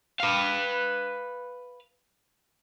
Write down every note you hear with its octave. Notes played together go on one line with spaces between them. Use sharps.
B4 F5